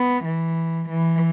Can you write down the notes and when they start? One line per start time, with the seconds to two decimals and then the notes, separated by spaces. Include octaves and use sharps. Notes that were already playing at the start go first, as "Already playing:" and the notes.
Already playing: B3
0.25 E3
0.90 E3